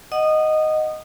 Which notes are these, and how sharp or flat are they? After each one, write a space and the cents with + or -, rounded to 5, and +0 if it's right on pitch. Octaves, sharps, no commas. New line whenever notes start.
D#5 +0 F#5 +0 D#6 -20